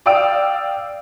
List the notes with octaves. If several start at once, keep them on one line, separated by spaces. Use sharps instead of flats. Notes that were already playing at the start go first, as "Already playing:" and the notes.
D5 F5 G5 D#6 E6 D7